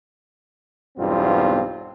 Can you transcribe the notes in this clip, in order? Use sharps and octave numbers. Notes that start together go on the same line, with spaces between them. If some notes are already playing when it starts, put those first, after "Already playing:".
B1 E2 G2 B3 C4 F4